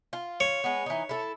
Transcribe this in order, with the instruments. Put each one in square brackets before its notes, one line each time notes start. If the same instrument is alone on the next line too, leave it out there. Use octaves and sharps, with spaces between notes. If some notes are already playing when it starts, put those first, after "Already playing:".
[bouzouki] F4
[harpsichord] C#5
[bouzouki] G#3 B3
E3 D#4
E4 A4